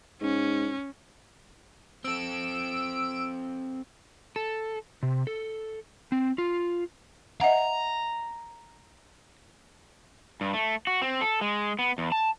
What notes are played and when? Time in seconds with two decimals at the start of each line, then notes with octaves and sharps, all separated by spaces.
0.22 G#2 C#4
2.04 C4 A4 E6 D7
4.36 A4
5.03 C3
5.27 A4
6.12 C4
6.38 F4
7.41 D#5 E5 F#5 A#5
10.41 G2
10.53 A3
10.87 F#4
11.02 C4
11.21 A4
11.41 G#3
11.79 B3
11.98 E2
12.12 A5